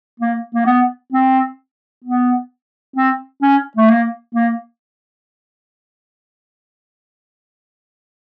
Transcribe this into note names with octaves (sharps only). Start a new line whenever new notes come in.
A#3
A#3
B3
C4
B3
C4
C#4
A3
A#3
A#3